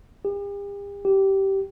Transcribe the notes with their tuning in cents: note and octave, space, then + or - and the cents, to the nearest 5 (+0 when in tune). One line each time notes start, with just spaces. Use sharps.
G4 +45
G4 -15